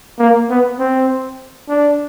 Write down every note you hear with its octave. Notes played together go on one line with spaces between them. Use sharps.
A#3
B3
C4
D4